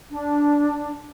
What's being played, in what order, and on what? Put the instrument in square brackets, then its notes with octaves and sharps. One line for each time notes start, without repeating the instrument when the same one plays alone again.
[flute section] D4